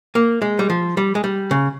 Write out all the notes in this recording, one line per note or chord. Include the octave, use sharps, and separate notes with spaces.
A#3
G#3
G3
F3
G3
G#3
G3
C#3